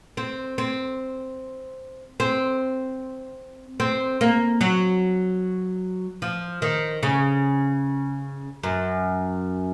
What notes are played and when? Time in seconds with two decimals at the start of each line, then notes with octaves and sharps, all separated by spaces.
0.17 C4
0.58 C4
2.20 C4
3.80 C4
4.21 A#3
4.61 F#3
6.22 F3
6.62 D#3
7.03 C#3
8.63 F#2